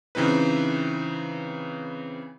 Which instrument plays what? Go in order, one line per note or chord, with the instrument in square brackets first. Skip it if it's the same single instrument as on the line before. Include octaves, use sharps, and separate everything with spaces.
[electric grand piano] C#3 E3 C4 D#4 B4